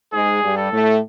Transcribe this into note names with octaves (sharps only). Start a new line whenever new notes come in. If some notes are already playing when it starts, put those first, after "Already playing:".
G#2 G#3 G#4
G2 G3
A4
A2 A3